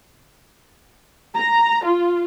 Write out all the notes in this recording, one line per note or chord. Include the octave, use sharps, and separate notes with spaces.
A#5
F4